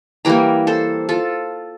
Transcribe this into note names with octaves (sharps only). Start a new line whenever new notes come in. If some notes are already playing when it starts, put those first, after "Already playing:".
E3 G3 A#3 G5 A#5
A4 C5
F4 A4